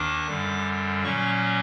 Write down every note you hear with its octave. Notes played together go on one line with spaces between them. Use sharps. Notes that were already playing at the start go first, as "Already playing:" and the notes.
Already playing: D#2 D#3 A#3 D4 D6
F#2 D3 G3
A#2 F#3 A#3 C#4 C#6